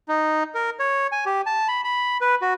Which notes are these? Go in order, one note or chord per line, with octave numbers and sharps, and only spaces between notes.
D#4
A#4
C#5
G#5
G4
A5
B5
B5
B4
F#4